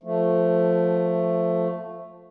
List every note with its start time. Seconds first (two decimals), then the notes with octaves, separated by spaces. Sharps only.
0.03 F3 A3